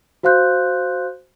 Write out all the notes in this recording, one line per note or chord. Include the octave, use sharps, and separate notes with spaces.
F#4 C5 F5 C6 F#6 G6